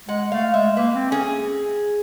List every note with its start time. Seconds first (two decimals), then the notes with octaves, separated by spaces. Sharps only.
0.08 G#3 F#5
0.31 A3 F5
0.54 G#3 E5
0.77 A#3 B4
0.94 C4
1.11 C#4 G#4